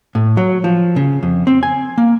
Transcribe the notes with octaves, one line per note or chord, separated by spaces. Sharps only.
A2
F#3
F3
C#3
F2
C4
G#5
A#3